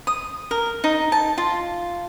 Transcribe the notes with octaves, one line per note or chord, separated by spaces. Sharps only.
D#6
A#4
D#4
A5
F4